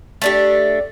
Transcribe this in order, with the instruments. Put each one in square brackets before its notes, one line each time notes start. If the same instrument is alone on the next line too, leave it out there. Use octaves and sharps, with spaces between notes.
[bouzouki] A3 D4 G4